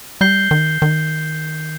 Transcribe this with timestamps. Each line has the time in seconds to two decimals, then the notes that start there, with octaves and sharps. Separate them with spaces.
0.21 G3 G6 C7 G7
0.51 D#3
0.82 D#3